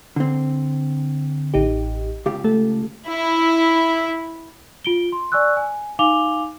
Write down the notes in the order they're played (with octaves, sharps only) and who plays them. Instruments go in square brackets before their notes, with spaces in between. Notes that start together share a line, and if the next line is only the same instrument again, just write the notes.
[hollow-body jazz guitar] D3 C4
[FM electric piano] A1 D#4 G4
[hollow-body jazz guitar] C#2 G4 F5
[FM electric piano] A3 A4
[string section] E4
[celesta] F4 D7 G7
C6
D5 G#5 C#6 E6 F#6
G#5
D#4 F5 G#5 D6 F7 G7